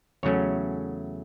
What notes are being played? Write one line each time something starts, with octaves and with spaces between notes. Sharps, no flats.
E2 C#3 F#3 A3 C#4 C#5